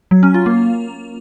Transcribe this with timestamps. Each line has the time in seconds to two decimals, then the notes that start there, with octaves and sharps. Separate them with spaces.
0.11 F#3
0.23 C#4
0.34 F4
0.46 A#3